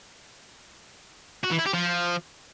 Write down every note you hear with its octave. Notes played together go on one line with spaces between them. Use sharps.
F#4
E3
E4
G4
F3